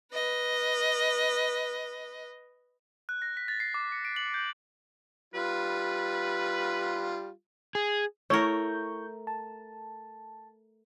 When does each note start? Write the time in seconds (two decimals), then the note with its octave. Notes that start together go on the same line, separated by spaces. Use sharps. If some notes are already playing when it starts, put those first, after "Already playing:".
0.13 B4 D#5
3.09 F#6
3.22 A#6
3.37 B6
3.48 A6
3.60 C7
3.74 D6
3.92 C#7
4.05 D7
4.16 F#7
4.34 G6
5.34 G3 F4 B4
7.75 G#4
8.30 A3 E4 A#4 C#5 C#6 G6
9.27 A5